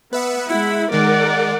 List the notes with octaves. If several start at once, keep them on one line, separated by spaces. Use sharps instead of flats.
B3 B4 E5 F#5
G#3 E4 F#5 B5
D#3 G#3 A#4 D5 F#5